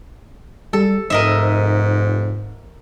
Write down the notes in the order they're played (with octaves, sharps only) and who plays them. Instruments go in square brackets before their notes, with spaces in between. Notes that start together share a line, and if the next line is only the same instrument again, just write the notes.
[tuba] G3 [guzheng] A4
[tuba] F1 [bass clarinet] G#2 [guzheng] A#4 D#5 E5